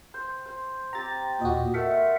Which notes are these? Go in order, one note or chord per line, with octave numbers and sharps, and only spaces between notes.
C5
C5
C4 G4 A#5 A6
D#2 A#2 F#4 D#5
A3 A#4 E5 F#5